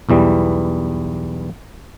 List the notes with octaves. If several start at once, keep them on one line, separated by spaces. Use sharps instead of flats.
B1 E2 E3 G3